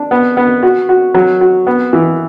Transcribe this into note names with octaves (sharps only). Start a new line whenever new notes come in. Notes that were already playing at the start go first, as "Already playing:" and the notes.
Already playing: D4
B3
B3
F#4
F#4
F#3
F#4
B3
E3